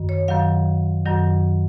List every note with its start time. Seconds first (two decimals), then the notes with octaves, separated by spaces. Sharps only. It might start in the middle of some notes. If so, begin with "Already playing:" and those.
Already playing: F#2 D#3
0.09 C#5
0.28 F#2 D#3 F#3 F5
1.06 F#2 D#3 F#3